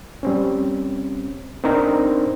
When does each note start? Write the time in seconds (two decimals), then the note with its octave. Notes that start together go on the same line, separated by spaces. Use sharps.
0.23 G3 C4 C#4
1.64 C4 D4 D#4 A#4 C5